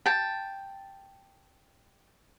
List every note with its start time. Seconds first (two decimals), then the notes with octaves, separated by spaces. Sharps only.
0.06 G5 A5